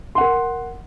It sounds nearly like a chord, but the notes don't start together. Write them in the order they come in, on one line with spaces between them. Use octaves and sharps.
C6 F#5 A#4